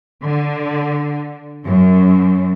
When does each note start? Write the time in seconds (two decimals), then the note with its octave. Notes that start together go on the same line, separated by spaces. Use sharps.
0.24 D3
1.65 F#2